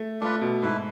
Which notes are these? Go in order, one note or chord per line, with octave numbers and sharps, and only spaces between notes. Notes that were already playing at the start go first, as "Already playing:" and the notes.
Already playing: A3
A3 D4 F4 B4
B2
G#2 A3 E4 B4